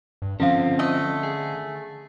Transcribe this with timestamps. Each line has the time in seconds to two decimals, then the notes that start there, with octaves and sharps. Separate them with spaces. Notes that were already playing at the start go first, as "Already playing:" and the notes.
0.22 G2
0.40 D3 F3 C4 C#4 F5
0.79 A3 D#5
1.23 G#4